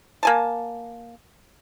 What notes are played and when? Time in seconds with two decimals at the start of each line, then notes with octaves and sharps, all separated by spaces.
0.23 A#3 G#5 A5